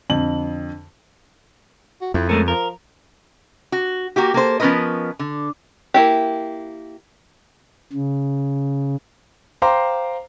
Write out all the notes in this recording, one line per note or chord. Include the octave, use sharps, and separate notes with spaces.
F2 D3 F#7
F#4
F2 E4
G#3 A3 C#4 A#4
F3 A#4
F#4
A#3 F#4 G4
A#3 A4 C5
F3 B3 C#4 A#4 B4 D#5
D3
A#3 E4 G4
C#3
C5 F5 G5 A#5 C6 D6